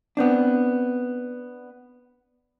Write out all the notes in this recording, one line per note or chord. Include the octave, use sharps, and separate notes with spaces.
B3 C4 D4